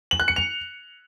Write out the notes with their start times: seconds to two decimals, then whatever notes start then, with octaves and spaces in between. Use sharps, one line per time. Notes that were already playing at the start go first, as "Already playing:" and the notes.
0.11 F#7
0.20 F#6
0.28 C#7
0.36 F7